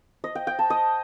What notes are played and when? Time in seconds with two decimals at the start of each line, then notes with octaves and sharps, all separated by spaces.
0.24 D#5
0.35 G5
0.47 G5
0.59 A5
0.70 D#5